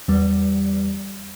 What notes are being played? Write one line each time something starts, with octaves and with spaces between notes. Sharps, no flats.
E2 G3